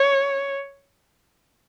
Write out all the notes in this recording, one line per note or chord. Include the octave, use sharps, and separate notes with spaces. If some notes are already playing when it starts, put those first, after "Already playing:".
Already playing: C#5